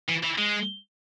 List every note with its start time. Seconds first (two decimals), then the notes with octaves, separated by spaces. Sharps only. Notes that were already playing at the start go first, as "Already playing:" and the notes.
0.09 E3
0.24 E3
0.38 G#3